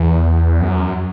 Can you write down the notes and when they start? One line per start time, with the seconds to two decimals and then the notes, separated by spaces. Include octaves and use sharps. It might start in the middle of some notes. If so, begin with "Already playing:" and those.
Already playing: E2
0.61 F#2